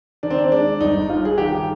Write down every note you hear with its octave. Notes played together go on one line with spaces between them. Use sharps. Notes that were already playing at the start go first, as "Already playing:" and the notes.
D#3 D4
C4
D4
G#3 D4
G1 D#4
G2 F4
G#4
D#3 G4